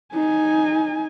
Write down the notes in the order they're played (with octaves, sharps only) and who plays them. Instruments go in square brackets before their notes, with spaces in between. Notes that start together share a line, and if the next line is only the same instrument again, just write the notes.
[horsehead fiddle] D#4 G#5